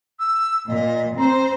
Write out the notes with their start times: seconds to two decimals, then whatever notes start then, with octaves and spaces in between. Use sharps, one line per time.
0.19 E6
0.68 A#2 D#5
1.17 C4 C5 A#5